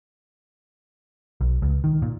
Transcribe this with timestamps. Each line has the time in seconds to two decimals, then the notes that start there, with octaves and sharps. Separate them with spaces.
1.41 B1
1.62 C#2
1.84 D#3
2.02 A#2